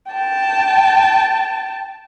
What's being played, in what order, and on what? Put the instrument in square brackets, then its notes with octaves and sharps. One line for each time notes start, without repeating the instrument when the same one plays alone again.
[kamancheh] G5 A5